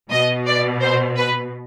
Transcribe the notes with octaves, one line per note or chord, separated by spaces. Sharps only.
B2 D#5
D5
C5
B4